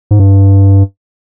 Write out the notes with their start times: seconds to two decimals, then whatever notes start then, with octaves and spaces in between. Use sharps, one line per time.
0.11 G#2
0.19 G2